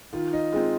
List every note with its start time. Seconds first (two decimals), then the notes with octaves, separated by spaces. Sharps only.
0.13 D#3 F4
0.33 D#4
0.53 G#3 C4 F4